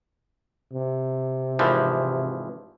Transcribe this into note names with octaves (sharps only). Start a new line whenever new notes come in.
C3
G#1 E3 F3